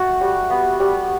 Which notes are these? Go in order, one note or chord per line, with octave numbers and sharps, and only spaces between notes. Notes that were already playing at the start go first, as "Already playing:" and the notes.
Already playing: A3 F#4
G3
B3
G3